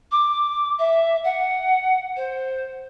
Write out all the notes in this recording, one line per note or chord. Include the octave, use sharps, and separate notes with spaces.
D6
E5
F#5
C5